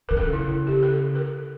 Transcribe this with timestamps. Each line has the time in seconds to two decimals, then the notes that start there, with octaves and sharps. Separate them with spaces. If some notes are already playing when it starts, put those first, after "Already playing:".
0.09 D3 A#4
0.17 C#3 A4
0.33 E4
0.67 G4
0.83 A4
1.15 A#4